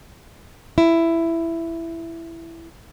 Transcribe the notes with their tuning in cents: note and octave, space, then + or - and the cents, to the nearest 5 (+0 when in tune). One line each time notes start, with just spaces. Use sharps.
E4 +10